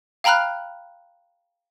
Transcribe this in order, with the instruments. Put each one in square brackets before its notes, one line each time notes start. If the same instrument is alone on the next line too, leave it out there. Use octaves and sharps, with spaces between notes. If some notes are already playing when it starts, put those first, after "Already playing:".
[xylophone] F5 G5 A#5 B5 F6 F#6